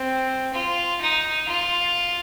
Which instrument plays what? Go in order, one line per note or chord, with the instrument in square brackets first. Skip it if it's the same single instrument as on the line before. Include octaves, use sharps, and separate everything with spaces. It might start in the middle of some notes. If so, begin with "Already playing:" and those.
Already playing: [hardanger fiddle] C4
F4
D#4
F4